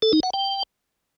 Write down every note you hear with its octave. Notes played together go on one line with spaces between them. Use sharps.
A4
D#4
F#5
G5